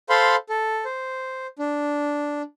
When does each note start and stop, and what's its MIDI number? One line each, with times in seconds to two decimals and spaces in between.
0.10 0.36 69
0.10 0.36 72
0.10 0.36 77
0.10 0.36 83
0.10 0.36 84
0.49 0.84 69
0.85 1.47 72
1.59 2.42 62